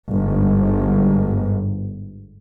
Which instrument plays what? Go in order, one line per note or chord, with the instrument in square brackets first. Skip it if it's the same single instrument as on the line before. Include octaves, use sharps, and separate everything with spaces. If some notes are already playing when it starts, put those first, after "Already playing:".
[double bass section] G1 G#2